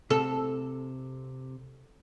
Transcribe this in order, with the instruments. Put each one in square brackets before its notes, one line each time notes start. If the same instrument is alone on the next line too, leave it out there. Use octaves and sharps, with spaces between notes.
[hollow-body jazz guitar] C3 [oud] A4